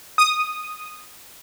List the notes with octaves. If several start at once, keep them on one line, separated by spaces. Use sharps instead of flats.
D#6